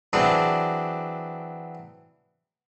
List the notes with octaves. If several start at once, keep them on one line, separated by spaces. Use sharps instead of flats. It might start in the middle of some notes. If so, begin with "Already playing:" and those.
E3 F#3 C4 D4 G#4 D5